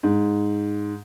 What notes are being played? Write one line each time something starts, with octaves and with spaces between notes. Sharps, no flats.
G#2